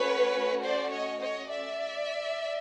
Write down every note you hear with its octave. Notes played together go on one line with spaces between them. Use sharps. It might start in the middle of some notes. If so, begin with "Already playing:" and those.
Already playing: A3 C#4 F#4 B4 C#5
C5 D5
C#5 D#5
C#5 D#5
D5 E5